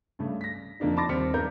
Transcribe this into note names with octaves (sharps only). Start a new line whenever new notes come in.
G2 C#3 A3
A#6 B6
F2 D3 A#3 D4 D#4
A5 B5 C6 D6 A6 A#6
D#2 G3 C4 F6 B6 C#7
G2 B3 A#4 G6